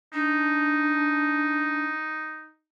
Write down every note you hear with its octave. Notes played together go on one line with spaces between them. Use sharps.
D4 D#4